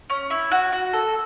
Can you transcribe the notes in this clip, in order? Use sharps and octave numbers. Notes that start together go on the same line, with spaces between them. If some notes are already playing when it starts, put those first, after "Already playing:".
C#4
E4
F#4
F#4
A4